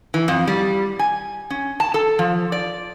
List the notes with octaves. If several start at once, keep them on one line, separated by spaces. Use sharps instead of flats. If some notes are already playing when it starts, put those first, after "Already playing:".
E3
F2
G3
G#5
C#4
A5
A4
F3
D5